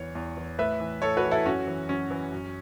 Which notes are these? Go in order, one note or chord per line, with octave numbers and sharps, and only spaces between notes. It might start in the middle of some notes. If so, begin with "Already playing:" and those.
Already playing: E2 E3 C#5
E2
E3
A2 B4 E5
E3
A2 A4 C#5
F#4 B4
E3
E4 A4
F#2 C#4 F#4
E3
F#2 C#4
E3
F#2